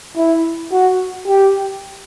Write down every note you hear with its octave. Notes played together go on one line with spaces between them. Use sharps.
E4
F#4
G4